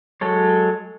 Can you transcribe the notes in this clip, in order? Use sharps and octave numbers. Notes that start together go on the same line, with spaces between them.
F#3 G#3 A4 C#5